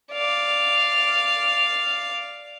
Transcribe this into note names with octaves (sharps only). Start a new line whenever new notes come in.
D5 F5